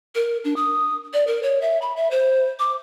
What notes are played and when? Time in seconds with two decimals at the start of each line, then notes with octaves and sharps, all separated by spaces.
0.15 A#4
0.45 D4
0.56 D#6
1.13 D5
1.27 A#4
1.43 C#5
1.62 E5
1.82 B5
1.96 E5
2.11 C5
2.59 D6